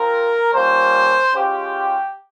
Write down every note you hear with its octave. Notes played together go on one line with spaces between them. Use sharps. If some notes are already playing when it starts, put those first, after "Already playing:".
Already playing: C4 F4 A#4
G3 A#3 C#4 F4 C5
G#3 C#4 F4 G4